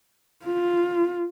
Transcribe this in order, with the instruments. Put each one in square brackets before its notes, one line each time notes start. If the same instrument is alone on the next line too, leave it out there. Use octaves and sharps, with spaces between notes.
[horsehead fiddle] F4